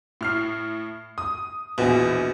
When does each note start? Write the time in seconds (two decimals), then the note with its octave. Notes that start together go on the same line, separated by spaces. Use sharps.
0.21 A2 F6 C7
1.18 D#6
1.78 A#1 E2 B2